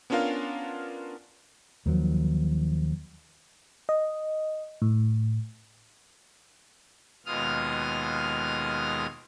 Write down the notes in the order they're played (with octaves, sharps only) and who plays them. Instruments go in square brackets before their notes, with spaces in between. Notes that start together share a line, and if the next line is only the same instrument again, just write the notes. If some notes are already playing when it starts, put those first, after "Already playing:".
[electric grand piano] B3 C#4 D4 F4 A#4 F5
[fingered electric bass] D#2 D#3 F3 F#3
[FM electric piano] D#5
A2
[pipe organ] D#2 B2 G#3 F4 D#6 F6